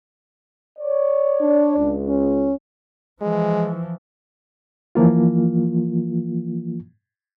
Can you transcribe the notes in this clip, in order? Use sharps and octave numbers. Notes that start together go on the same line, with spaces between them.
C#5 D5
D4
C#2
C#4
E3 F3 G#3
E3 F3 A#3 F4